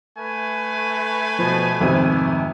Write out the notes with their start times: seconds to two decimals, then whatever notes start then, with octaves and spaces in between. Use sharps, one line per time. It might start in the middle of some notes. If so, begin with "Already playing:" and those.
0.17 A3 B4 G#5
1.39 B2 F3
1.81 G#1 F2 C3